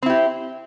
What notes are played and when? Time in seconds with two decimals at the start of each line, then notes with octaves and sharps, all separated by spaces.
0.03 C4
0.06 E4
0.10 G4